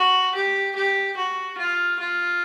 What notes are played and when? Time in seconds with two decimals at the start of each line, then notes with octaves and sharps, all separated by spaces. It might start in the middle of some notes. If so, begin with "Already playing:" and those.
Already playing: F#4
0.35 G4
0.76 G4
1.16 F#4
1.58 F4
1.99 F4